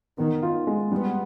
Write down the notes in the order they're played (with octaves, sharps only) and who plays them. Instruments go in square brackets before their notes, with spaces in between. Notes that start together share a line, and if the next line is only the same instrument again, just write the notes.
[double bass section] D#3 [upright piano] B3
[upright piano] F4
G#3
[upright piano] G3 [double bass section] B3